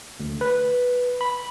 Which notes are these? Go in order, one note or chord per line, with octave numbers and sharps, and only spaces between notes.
D2
B4
B5